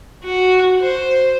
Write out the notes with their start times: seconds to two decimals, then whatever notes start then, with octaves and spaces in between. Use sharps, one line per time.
0.24 F#4
0.81 C5